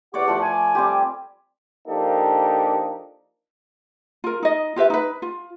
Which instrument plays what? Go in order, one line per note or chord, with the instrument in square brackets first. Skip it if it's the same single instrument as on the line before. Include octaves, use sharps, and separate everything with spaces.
[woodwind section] E2 G4 F#5 [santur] C#5 D5 D6
[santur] F3 A3 A4
[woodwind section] G#5
[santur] G3 C4 G4
[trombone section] F3 A#3 D4 D#4 G4 A4
[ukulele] F4 A#4
D#4 D#5
F4 G4 B4 E5
D#4 B4
F4